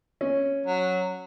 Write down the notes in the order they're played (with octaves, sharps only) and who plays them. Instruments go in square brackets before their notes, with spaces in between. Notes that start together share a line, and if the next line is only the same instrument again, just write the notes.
[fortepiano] C#4
[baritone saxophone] F#3